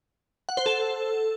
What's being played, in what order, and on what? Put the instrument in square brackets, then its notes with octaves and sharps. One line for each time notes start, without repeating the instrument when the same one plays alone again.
[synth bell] F#5
C5
A4